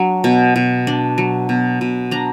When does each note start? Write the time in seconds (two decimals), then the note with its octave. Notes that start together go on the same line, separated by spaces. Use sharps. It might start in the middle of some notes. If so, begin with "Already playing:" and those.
Already playing: F#3 D4
0.24 B2
0.56 B2
0.87 D4
1.18 F#3
1.49 B2
1.81 B2
2.11 D4 A#5